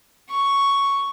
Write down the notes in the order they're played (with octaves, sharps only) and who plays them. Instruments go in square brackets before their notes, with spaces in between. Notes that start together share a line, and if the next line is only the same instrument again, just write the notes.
[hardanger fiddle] C#6